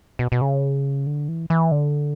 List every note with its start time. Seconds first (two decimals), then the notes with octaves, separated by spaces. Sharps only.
0.19 B2
0.32 B2
0.41 C#3
1.07 D3
1.28 E3
1.50 E3
1.71 D3